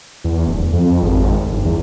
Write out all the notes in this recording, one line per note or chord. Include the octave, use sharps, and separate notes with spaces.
E2
D1
F2
G#1
G1
E2